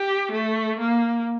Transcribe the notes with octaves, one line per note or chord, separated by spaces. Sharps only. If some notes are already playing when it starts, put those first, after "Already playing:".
Already playing: G4
A3
A#3